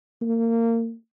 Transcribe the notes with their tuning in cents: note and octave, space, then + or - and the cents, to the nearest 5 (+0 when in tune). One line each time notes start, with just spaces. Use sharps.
A#3 -25